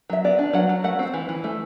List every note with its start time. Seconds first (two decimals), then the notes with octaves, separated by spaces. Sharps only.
0.10 F#3 E5
0.24 B3 D5
0.39 D4
0.53 F#3 F#5
0.69 F#3
0.84 A3 F#5
0.99 C4
1.14 E3
1.29 E3
1.44 A3